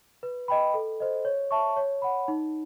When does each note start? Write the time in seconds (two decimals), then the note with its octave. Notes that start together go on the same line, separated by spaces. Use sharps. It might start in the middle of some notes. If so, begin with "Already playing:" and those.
0.23 B4
0.48 D#5 G5 B5
0.74 A4
1.00 C5 D#5
1.25 C#5
1.51 E5 A5 C#6
1.77 C#5
2.02 F#5 B5
2.28 D#4